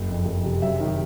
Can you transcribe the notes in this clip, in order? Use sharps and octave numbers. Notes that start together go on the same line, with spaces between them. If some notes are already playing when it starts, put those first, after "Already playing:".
Already playing: F#1 F#3
F2
F#1
C3
F#2 E5
D#3
G4